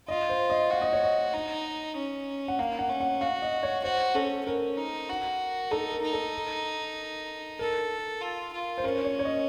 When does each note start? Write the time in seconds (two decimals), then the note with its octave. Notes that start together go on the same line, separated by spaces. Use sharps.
0.08 F4 D#5
0.29 C5
0.50 D#5
0.71 F#4 F5
0.82 D#5
0.93 C#5
1.03 D#5
1.33 D#4
1.96 C#4
2.48 F#5
2.59 A#3 F5
2.79 F#5
2.90 C#4
3.00 F#5
3.21 F#4 F5
3.42 D#5
3.63 C#5
3.84 F#4 C5
4.15 C#4 A4
4.46 C#4 A#4
4.78 D#4
5.09 F#4
5.71 D#4 A4
5.92 A#4
6.03 D#4
6.13 A4
7.59 A4 A#4
8.21 F4
8.53 F4
8.78 C5
8.84 C#4 A#4
9.04 C#5
9.19 C#5
9.25 D#5